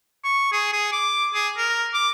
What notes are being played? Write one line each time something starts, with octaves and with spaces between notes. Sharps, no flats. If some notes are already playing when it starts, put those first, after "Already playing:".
C#6
G#4
G#4
D6
G#4
A#4
D6